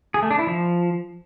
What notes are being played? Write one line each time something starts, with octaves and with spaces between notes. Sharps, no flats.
G#4
A3
D4
E4
F3